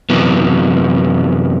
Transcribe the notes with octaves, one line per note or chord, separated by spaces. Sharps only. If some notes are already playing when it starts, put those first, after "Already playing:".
F#2 C3 E3 F#3 B3